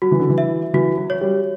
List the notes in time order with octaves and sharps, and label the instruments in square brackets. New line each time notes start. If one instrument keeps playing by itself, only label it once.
[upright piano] F#3 [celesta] F#4
[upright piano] E3
D3
E3
[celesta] E5
[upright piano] E3 [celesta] F#4
[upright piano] F#3
[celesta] C#5
[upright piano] G3